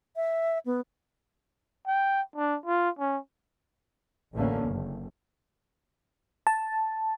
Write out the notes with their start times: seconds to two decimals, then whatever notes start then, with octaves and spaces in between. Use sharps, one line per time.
0.16 E5
0.66 B3
1.87 G5
2.36 D4
2.66 F4
2.99 C#4
4.33 A1 E2 D3 A3 A#3 C#4
4.64 F#1
6.47 A5